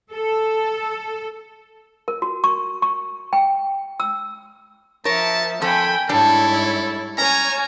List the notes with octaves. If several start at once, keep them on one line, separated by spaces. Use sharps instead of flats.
A4
A#4
F#4
C#6
C#6
G5
E6
F3 A#4 C#5 E5 A5
F2 A4 G5 G#5 B5
G#2 G3 D4 E4 A4 C#5 D5 A5
C#4 C#5 G#5 A#5 F6